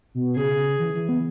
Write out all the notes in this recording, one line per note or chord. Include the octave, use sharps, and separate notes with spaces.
B2
C#3 G#4
E3
E3
B3